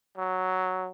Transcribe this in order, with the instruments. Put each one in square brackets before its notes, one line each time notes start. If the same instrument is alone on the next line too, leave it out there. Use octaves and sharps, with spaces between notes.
[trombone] F#3